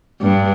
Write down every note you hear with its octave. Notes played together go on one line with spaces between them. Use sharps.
G2